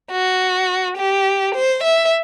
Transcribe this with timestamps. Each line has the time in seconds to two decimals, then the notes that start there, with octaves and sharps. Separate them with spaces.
0.12 F#4
0.97 G4
1.55 C5
1.83 E5